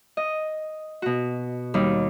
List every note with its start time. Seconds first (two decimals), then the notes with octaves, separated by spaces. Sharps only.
0.17 D#5
1.02 B2 F#4
1.74 D#2 G3 D#4